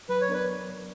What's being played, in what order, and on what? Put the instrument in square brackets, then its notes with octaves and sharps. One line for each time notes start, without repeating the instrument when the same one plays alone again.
[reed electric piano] F#3 [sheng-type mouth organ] B4
[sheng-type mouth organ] C#5
[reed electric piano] B3 D4 A#4 D5 [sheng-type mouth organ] B4